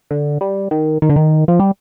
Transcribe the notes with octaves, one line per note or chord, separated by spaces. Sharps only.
D3
G3
D#3
D#3
D3
D#3
F3
G3